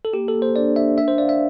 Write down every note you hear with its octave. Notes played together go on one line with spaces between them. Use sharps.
A4
A#3 G4
A4
A#3
C5
D4 D5
D4 E5
A#4 E5
C5
D5 F5
E5